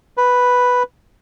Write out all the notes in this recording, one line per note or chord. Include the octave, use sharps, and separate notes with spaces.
B4